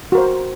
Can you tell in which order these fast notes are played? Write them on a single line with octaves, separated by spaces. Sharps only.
F#4 A#4 C5